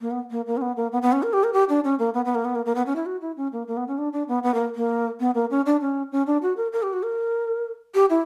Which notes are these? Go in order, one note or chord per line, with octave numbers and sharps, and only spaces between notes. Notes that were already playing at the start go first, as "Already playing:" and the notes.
A#3
B3
A#3
A#3
C#4
B3
A#3
B3
B3
C#4
A#4
G4
A#4
G4
D4
C#4
A#3
B3
B3
A#3
B3
A#3
A#3
B3
C#4
E4
F#4
E4
C#4
A#3
A#3
B3
C#4
D4
D4
B3
B3
A#3
A#3
B3
A#3
C#4
D4
C#4
C#4
D4
F#4
A#4
A#4
G4
F#4
A#4
G4
E4